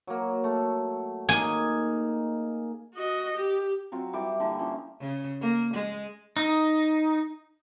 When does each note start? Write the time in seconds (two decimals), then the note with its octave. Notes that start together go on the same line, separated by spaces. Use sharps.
0.07 F#3 A#3
0.44 A3
1.29 A#3 D#4 G#4 G#5
2.94 F#4 D#5
3.37 G4
3.92 F#3 C4 F4
4.13 E3 G3 G4 D6
4.40 D3 E3 A#3
4.59 F3 C#4 E4
5.00 C#3
5.41 A#3
5.74 G#3
6.37 D#4